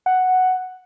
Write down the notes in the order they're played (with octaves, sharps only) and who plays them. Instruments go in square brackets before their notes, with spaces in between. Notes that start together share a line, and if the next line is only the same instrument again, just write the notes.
[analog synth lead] F#5